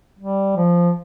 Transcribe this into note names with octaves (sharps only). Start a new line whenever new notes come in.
G3
F3